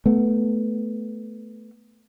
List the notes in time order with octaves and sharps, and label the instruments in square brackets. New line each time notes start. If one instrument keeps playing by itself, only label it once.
[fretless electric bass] A3 B3